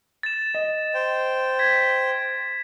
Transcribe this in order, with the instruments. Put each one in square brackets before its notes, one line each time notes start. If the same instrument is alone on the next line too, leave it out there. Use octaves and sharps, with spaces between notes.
[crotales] A6 E7
[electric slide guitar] D#5
[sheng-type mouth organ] C5 G5
[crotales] G#6 B6